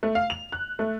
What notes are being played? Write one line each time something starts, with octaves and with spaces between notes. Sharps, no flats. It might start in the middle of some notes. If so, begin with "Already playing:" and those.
A3
F5
F7
F#6
A3